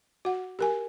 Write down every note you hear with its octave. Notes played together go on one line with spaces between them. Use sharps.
F#4 F#5
G4 A#4 G#5